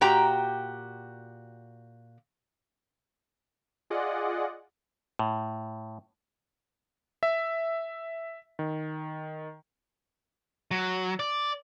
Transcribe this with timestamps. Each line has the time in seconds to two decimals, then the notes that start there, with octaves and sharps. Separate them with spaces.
0.01 A#2 F#4 G4 G5 A#5
3.90 F4 G#4 D5 D#5 F#5
5.19 A2
7.23 E5
8.59 D#3
10.71 F#3
11.19 D5